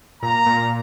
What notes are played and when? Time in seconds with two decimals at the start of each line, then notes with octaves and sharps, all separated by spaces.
0.22 A#2 A#5
0.46 A#2